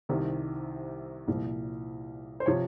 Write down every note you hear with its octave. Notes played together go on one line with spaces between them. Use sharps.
C2 C3 D#3
C2 A#2 F3
C5
C3 F3 C#5